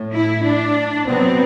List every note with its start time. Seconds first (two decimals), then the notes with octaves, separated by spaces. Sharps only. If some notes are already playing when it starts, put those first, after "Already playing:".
Already playing: A2
0.13 E4
0.44 D4
1.07 C3 F#3 B3 C4